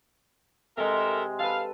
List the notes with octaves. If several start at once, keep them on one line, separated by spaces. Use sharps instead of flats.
C3 G#3 A4 A#4 E5
A4 B4 F5